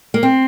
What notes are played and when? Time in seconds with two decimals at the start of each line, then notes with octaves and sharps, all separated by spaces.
0.14 A#3
0.23 C4